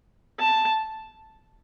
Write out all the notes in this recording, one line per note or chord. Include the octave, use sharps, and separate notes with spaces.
A5